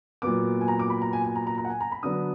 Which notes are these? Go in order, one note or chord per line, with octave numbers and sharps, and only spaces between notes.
A#2 F#3 B3 D6
G#5
A#5
D6
B5
A#5
G#5
G#5
A#5
A#5
A#5
F#5
G#5
A#5
B5
D3 F#3 B3 D4 D#6